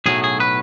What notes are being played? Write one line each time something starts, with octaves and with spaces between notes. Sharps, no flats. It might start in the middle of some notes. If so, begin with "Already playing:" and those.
B1 A2 F#3 A3 G#4
G#4
B4